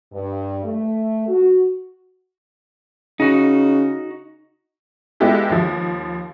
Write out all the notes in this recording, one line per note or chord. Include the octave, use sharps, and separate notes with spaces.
G2
A3
F#4
C#3 D#4 F#4
G#3 B3 E4 F4 G4 A4
D#2 F3